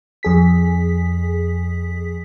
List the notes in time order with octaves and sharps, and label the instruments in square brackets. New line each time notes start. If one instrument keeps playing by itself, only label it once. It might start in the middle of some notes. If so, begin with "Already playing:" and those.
[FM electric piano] F2 G#4 B6